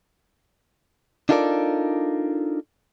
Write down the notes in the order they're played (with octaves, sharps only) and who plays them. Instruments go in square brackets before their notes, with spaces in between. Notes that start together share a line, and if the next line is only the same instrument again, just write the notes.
[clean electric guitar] D4 D#4 F4 A4 A#4 D5